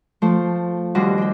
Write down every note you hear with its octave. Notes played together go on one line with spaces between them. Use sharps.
F3 A3 C5
D#2 G3 D4 F#4 C6
D4 G5